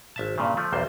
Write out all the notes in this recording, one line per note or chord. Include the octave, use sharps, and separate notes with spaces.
G#1 E5 A5
G2 A#2 C#3
F3 A3
B1 E2 G3 C5